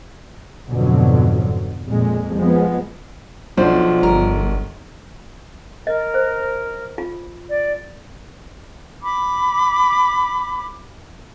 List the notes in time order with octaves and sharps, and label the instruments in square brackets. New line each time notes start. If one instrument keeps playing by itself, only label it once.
[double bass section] F2 G#2 B2 D3 F#3
F2 A#2 G#3
F3 G#3 B3
[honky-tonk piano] B1 D4 [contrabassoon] F3 [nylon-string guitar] C5
[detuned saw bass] G1 [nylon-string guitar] A#4
[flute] A#4 [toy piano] D#5
[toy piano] C5
F4
[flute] D5
[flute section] B5 D6